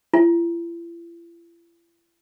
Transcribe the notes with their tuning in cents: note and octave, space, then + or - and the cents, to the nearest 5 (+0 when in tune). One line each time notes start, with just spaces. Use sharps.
E4 +45